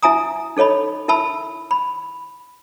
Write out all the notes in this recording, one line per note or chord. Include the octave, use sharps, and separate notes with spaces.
E4 E5 G#5 A#5 D#6
D#4 A4 C#5 D#5 B5
E4 A#4 E5 A5 B5 E6
B5